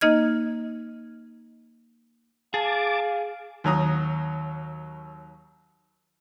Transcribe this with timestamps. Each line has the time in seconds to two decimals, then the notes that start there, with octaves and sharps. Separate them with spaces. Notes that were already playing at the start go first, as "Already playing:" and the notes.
0.01 A#3 D#4 D#5 F6 G#6
2.54 G#4 F5 A5 D6
3.64 D#2 F#3 A#5 D#6